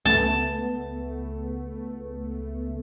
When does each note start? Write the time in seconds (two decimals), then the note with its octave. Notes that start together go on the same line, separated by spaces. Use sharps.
0.05 C#2 A3 B3 A5